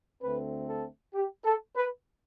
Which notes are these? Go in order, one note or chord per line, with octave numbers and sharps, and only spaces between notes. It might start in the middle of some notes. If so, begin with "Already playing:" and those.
D2 D3 A3 C4 B4
A4
G4
A4
B4